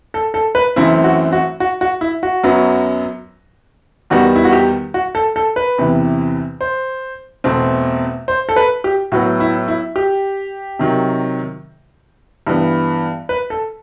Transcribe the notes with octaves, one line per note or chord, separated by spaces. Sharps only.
A4
A4
B4
F#2 E3 A3 C4 E4
F#4
F#4
F#4
F#4
E4
F#4
F#2 F#3 B3
E2 D#3 G3 B3 F#4
E4
F#4
G4
F#4
A4
A4
B4
E2 C3 E3
C5
E2 B2 A3 C4
C5
A4
B4
G4
A2 F#3 B3 F#4
E4
E4
G4
C3 D#3 F#3
G2 E3 B3
B4
A4